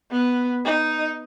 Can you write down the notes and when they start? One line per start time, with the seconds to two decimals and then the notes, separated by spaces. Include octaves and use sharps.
0.11 B3
0.65 D#4